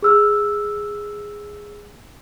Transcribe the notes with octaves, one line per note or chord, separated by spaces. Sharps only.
G#4 E6 F6